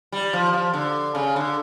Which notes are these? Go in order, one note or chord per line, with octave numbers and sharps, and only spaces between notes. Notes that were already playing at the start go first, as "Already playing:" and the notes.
G3
F3
F3
D3
C#3
D3